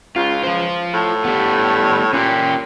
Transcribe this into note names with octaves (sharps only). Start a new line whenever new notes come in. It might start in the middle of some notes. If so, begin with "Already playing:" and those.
C#2 F4
F4 C5
A2
G3 B3
A#2 C#4 G4